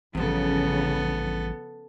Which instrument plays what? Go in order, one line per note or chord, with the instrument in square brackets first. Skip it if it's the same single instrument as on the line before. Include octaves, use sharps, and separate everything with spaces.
[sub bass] A1 [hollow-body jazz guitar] E2 G2 [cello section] C#3 F3 [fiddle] B3 A4